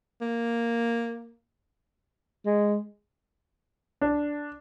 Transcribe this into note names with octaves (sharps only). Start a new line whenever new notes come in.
A#3
G#3
D4